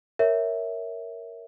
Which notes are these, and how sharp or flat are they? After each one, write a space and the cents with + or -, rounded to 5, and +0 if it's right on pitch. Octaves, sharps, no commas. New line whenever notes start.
A#4 -5 C#5 +0 E5 -10